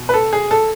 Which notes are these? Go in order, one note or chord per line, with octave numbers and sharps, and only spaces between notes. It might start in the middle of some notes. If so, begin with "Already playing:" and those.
Already playing: B2
B4
A4
G#4
A4